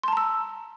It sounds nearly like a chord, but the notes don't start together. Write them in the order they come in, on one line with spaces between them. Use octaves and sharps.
C6 A5 A#5 E6